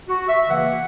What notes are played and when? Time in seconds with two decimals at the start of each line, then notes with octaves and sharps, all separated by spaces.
0.08 F#4
0.28 E5
0.48 C#3 E3 A#3 F#5